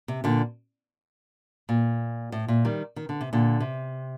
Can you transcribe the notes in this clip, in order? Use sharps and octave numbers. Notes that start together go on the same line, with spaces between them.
C3
A#2 D3
A#2
A2
A#2
D#3 G3
D#3
D3
C3
A#2 D3
C3